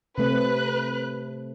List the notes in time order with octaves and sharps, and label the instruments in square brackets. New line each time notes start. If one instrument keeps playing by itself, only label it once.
[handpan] C3 A3 C4 [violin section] B4 F#6